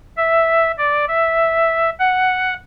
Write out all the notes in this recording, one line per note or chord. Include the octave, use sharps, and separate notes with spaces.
E5
D5
E5
F#5